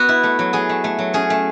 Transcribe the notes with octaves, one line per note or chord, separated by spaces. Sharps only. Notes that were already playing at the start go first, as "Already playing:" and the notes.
Already playing: B3 F#4
E4
A3
F#3
F#3 G#4
A3
A3
F#3
C#4 G#4
A3